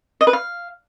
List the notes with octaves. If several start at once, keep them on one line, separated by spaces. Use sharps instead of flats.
D#5
B4
F5